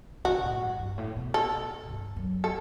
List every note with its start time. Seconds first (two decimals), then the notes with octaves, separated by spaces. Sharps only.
0.24 C#3 F#4
0.43 A2
0.62 G2
0.79 G2
0.98 A2
1.16 B2
1.34 A4
1.89 G2
2.16 F#2
2.44 A4